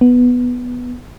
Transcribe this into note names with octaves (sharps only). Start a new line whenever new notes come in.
B3